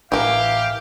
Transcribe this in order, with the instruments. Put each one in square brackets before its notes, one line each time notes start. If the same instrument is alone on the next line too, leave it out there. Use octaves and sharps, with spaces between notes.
[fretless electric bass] A1 [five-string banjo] E3 A#4 [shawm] G4 [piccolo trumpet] F5